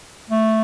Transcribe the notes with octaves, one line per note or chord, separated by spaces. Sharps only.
A3